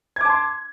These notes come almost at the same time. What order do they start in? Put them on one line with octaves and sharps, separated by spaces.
G#6 D6 A5 C6